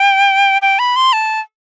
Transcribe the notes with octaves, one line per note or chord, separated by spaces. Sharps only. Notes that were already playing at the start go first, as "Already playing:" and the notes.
Already playing: G5
G5
B5
C6
A5